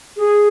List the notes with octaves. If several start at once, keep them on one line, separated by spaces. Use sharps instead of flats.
G#4